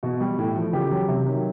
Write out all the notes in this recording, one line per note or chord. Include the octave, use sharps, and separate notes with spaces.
B2 F#4
G3
A2
F3
C#3 G4
F#3
C3
D#3 F#3